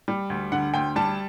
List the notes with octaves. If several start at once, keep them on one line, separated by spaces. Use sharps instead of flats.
G3
D2
D3 F#5
D2 G5
G3 A5